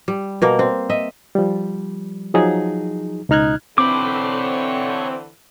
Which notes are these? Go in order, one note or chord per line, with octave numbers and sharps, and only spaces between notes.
G3
B2 A#3 A#4
C4
D#5 E5
F3 G3
F3 F#3 D#4 G#4
C#2 B2 D#4 F6 F#6 G#6
D3 E3 C4 C#5 B5 D6